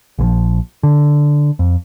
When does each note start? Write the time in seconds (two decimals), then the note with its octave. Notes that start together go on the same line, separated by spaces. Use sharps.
0.18 A#1 E3 F3
0.83 D3
1.59 F2